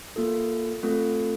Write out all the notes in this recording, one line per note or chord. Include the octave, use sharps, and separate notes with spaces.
A#3 F4 A4
A3 C4 F4 A4